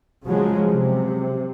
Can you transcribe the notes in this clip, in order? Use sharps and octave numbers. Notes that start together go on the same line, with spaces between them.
C#3 F3 F#3 G#3
C3